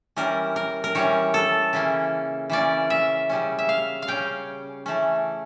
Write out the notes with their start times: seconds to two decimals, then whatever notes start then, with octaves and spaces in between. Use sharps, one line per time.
0.16 E3 G3 C#4 A#4
0.56 A#4
0.84 A#4
0.95 E3 G3 C#4 C#5
1.34 A4
1.73 C#3 E3 A#3 C#4
2.50 C#3 E3 A#3 C#4 D5
2.90 E5
3.29 C#3 G3 C#4
3.59 E5
3.69 F5
4.02 F5
4.08 C#3 G3 C#4 G5
4.86 E3 A3 C#4